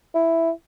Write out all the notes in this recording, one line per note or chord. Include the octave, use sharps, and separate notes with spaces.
E4